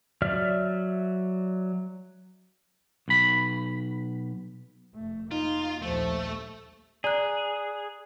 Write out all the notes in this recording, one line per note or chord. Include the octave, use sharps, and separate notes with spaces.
F#3 D5 E5 F6
B1 B5
F1 A3
A#3 D#4 F4
A#1 D#2 F3 A3
G#4 D5 A#5 F#6